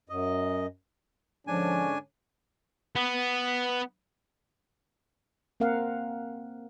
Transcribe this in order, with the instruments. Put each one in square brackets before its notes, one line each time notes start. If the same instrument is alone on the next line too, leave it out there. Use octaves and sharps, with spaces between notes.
[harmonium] F#2 D#5
[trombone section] G#2 D3 C#4 [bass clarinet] F3 [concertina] D4 G#5
[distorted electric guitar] B3
[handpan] A#3 C4 A#4 F5 F#5